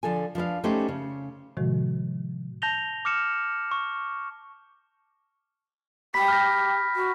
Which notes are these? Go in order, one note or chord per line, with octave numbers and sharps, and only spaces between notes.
D3 F3 A4 G#5
F3 D4 B4 F5
A3 C#4 D#4 G4 B4 C5
C#3
A2 C3 D#3 F3 G#3 F#4
A5 G6 A#6 F7 G7
D6 F6 C#7 E7
C#6
G4 B5 B6
F6 G6 A#6
F#4